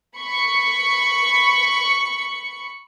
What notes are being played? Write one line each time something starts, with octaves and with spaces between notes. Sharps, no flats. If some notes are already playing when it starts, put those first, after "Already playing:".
B5 C#6 C#7